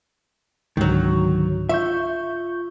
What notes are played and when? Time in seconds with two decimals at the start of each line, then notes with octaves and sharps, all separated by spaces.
0.77 C#2 G#2 D3 D#3 F#3
1.69 F4 E5 C#6 G6